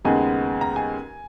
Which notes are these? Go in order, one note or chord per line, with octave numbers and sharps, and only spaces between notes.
D#2 C#3 G#3 B3 G#5
A#5
G#5